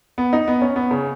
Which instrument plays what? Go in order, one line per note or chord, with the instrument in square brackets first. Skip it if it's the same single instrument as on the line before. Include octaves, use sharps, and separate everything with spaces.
[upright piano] B3
D#4
B3
C#4
B3
C#3